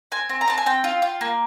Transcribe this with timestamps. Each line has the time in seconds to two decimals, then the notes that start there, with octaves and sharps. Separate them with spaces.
0.12 C4 G#5
0.29 C4
0.41 A#5
0.48 C4 A5
0.58 G#5
0.66 C4 G5
0.84 F4
1.02 F4
1.21 A#3